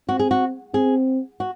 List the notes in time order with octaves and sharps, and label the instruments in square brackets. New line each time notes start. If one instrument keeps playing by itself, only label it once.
[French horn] C4 [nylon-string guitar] F#4
[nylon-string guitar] G#4
F#4
[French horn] C4 [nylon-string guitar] G#4
[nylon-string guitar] F#4